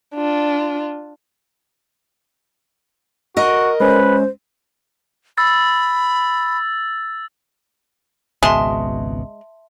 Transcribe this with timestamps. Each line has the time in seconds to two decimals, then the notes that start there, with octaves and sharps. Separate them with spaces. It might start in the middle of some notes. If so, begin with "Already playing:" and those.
0.15 D4 F4
3.37 F#4 A#4 D#5
3.80 G#3 C#4 B4 C5
5.38 B5 E6 A6
8.43 G#1 C#2 B2 G#3 E5 A5 C6